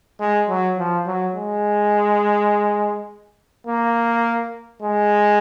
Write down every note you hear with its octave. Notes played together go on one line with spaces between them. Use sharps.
G#3
F#3
F3
F#3
G#3
A#3
G#3